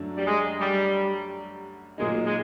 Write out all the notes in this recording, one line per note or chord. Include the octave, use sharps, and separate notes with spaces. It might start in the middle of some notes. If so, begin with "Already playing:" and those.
Already playing: F#2 D3 F#3 A3 D4
G3
G#3
G3
A#2 F#3 G#3 A#3 D#4
G#3